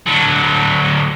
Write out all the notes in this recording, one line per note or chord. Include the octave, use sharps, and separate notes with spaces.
D3 F#3